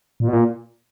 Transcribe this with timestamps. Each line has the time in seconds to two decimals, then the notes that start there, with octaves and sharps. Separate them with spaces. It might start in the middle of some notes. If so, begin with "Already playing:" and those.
0.20 A#2
0.28 B2
0.33 A#2